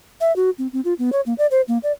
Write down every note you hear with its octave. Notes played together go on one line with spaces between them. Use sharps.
E5
F#4
C4
C4
F4
B3
C#5
A#3
D5
C5
A#3
D5